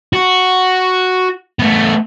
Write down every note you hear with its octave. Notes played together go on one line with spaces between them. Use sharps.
F#4
A3 B3